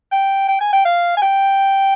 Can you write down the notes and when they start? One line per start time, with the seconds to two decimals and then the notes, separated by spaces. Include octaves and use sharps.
0.12 G5
0.49 G5
0.61 G#5
0.73 G5
0.85 F5
1.17 G#5
1.22 G5